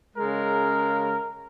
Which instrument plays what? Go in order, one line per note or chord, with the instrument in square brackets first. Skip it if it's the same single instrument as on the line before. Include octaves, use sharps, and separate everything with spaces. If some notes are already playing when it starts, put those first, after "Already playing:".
[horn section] C#3 G#3 A#4